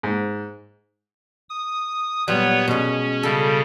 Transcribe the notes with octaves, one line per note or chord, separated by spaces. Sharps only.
G#2
D#6
A#2 F#3 G3 B3 B4 C#5
B2 G#3 C#4
C#3 G3 A4